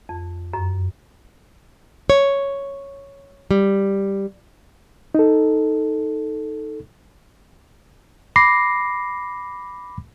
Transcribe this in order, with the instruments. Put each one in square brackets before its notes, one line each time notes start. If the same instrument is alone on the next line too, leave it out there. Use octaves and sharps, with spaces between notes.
[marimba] F2
F#2
[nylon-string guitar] C#5
G3
[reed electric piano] D#4 A4
[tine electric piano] B5 D6 A#6 C7